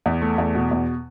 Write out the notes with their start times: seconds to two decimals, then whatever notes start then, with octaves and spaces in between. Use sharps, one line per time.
0.06 E2
0.22 A3
0.38 E2
0.55 B2
0.71 E2